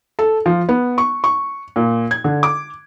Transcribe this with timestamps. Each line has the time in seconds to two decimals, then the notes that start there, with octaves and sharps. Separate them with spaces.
0.19 A4
0.46 F3
0.69 B3
0.98 C#6
1.24 C#6
1.76 A#2
2.11 G#6
2.24 D3
2.43 D6